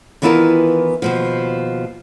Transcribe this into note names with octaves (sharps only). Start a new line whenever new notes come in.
D#3 E3 B3 E4 F4 A#4
D#2 B2 F3